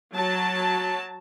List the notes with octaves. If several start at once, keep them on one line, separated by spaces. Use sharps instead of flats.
F#3 A5